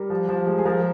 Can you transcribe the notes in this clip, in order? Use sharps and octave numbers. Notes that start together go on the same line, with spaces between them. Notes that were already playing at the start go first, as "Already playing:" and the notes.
Already playing: G3 A#4
F3
F3
G#3
G#4
F3 A#4